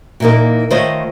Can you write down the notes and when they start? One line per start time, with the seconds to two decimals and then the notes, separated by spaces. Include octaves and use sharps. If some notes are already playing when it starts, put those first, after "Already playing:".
0.20 A#2 E3 A#3 D#4 A#4
0.71 D#3 A3 F4 C5 C#5 D#5